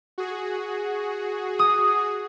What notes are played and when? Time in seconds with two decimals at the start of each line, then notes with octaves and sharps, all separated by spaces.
0.18 F#4 G#4
1.59 D#6